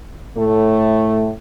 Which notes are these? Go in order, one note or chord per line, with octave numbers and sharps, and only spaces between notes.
A2 A3